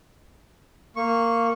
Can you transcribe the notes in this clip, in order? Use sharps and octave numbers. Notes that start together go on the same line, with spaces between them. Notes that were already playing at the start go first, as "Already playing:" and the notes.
A#3 C#6